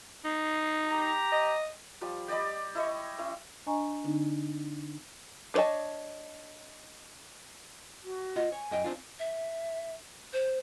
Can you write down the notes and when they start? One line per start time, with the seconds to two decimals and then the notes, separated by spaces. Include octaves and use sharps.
0.25 D#4
0.88 G4 A#5
1.32 D#5
2.01 F3 G3
2.28 G4 D5 D#5 B5
2.75 E4 D#5 C#6
3.18 C#4 E4
3.66 D4 D#5 G#5 A#5 C#6
4.04 D3 C4 D4 D#4
5.54 D4 B4 C#5 D#5 A5
8.04 F#4
8.36 F4 D#5 F#5
8.52 C#5 G#5
8.71 F#2 D#5 G5
8.84 C4 D4 F4
9.19 E5
10.33 C5